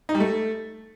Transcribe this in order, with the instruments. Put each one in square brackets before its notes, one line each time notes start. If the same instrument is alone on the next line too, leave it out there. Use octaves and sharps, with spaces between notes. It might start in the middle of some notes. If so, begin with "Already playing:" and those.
[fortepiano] D#4
G3
A3